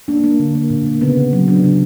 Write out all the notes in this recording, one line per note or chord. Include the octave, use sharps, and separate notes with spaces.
A#3 D4
A#3
D3
A#3
A#2
A#3
C#3 B3
C#3
F#3
C#3 D4
C#3